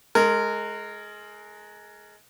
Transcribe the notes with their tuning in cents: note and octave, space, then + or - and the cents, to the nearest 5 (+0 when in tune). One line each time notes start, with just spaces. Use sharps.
G#3 +15 A#4 -20